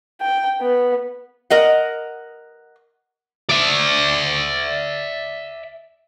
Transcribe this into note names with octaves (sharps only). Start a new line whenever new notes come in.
G5
B3
A#4 D#5 F#5
D5 E5